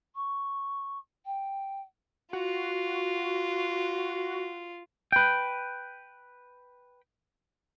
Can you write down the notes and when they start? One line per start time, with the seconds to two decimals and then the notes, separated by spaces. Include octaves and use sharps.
0.15 C#6
1.26 G5
2.33 F4 F#4
5.12 B4 G5